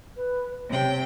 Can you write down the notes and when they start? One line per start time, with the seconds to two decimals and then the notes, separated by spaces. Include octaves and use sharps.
0.16 B4
0.70 C3 C#5 G5